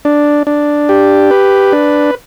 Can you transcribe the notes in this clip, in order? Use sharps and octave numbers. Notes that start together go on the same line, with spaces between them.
D4
D4
G4
B4
D4